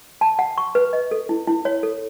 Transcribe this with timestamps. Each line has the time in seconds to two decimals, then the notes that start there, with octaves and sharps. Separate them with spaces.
0.21 A5
0.39 F#5
0.58 C#6
0.75 B4
0.93 D#5
1.11 A4
1.29 E4
1.47 E4
1.65 C#5
1.83 A4